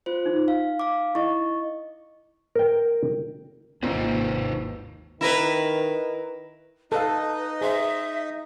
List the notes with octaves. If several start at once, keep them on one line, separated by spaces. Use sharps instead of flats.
F4 C5
D#4
F5
F5 D6
E4 D#5 C#6
A#4 G5
G#1 D#2 A#2 D#4 B4 C5
D#3 E4 A#4 B4
D#4 A4 B4 D#5 F5
G#4 C5 E5